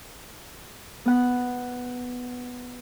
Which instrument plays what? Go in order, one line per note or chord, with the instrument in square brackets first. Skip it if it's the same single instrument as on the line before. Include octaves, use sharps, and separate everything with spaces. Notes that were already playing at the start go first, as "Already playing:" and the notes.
[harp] B3 F#5